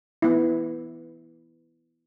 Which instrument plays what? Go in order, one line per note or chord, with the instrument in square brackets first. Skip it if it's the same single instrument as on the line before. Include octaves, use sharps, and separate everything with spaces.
[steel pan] B3 E4